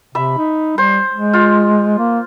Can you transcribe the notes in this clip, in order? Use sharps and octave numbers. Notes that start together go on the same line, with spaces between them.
C3 E5 B5
D#4
G3 C5
G#3
F4
A#3